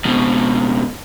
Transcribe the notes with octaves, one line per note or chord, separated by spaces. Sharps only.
F2 B2